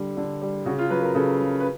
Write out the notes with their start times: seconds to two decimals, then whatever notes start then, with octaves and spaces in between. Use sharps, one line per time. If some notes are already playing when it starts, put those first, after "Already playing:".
Already playing: D3 G3
0.17 D3
0.42 G3
0.66 C#3 F#4
0.78 F4
0.90 F#3 B4
1.02 A#4
1.15 C#3 A4
1.40 F#3
1.60 B4